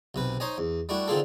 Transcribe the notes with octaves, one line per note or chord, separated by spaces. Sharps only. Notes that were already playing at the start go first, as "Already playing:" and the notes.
B1 C3 B4
D#4 C5 C#5 D#5 G#5
E2
G3 A3 D4 E4 F#4
D3 D#3 C4 F4 G#4 A4